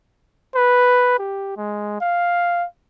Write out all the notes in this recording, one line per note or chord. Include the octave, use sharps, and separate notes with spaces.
B4
G4
G#3
F5